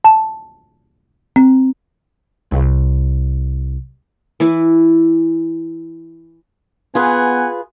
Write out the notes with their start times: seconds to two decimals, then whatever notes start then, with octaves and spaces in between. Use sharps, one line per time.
0.04 A5
1.36 C4
2.51 C2
4.40 E3 E4 B4
6.95 B3 F4 G#4 B4 F#5 G#5